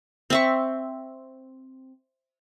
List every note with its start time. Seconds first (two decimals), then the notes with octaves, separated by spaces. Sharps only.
0.30 C4 E5 C#6